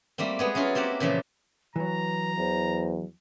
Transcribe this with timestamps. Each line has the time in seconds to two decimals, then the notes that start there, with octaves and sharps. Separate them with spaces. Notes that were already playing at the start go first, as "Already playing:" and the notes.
0.18 G3 A3 A#3 C4
0.39 G#3 B3 G#4
0.55 F#3 C#4 E4 F4
0.75 A#3 C4 G4 A#4 F#5
1.00 A#2 C#3 E3 F3 A4
1.76 E3 F#3 B4 A#5
2.38 E2 C5